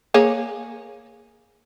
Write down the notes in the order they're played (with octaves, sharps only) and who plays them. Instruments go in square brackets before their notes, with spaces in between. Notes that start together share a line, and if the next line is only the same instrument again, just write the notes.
[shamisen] A#3 G#4 C#5